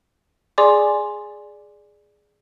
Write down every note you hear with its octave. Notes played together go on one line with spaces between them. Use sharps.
G#4 D5 G#5 C6 D6